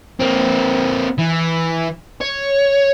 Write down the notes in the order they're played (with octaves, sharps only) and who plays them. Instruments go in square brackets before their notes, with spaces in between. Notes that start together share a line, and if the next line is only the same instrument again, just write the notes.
[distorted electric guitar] A#3 C4
E3
C#5